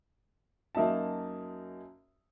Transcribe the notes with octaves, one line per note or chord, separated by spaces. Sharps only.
F#2 A#3 D#4 E5 A5